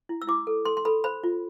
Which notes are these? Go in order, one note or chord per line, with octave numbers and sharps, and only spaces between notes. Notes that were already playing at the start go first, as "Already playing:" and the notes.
E4
E6
E4 D6
A4
A4 C6
C6
A4 B5
C5 B5
F4